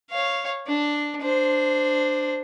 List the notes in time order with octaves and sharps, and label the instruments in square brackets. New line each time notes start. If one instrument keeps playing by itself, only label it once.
[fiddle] C#5 F5
D4
D4 C5